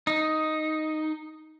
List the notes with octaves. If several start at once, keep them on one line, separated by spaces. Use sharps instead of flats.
D#4